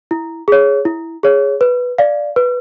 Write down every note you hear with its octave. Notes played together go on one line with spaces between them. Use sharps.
E4
G#4 C#5
E4
G#4 C#5
B4
D5 F5
B4